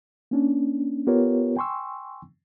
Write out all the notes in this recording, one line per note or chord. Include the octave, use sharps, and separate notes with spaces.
A#3 C#4 D4
B3 F4 G4 A#4 B4 C#5
G5 G#5 C6 C#6 E6